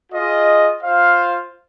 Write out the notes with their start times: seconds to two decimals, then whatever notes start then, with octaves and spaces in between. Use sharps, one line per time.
0.12 F4 G#4 D#5
0.83 F4 C5 F5